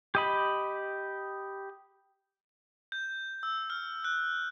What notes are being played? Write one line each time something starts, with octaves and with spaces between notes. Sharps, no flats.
G4 D#5 B5
G6
E6
F6
F#6